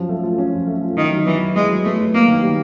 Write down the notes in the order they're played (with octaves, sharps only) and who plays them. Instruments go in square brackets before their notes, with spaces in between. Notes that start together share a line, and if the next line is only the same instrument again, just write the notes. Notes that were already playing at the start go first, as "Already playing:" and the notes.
Already playing: [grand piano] F3 F#3 C#4
A3
F4
C#4
F3
A3
F4
[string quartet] D#3 [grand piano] E4
[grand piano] F#3
[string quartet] E3 [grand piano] B3
[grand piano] F#3
[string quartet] G#3 [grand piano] E4
[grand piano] F#3
[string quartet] A3 [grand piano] B3
[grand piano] F#3
[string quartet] A#3 [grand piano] B3
[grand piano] D#3
G3